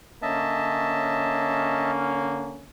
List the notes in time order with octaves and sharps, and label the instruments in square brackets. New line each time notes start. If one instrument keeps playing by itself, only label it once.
[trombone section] D3 A#3 C#4 [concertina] D#5 E5 A5